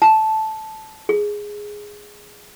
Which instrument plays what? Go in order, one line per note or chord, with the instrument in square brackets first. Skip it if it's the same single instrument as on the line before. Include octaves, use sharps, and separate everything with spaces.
[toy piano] A5
G#4